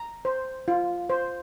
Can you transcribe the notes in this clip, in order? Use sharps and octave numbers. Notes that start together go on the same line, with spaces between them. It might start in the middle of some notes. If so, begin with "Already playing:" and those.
Already playing: A#5
C5
F4
C5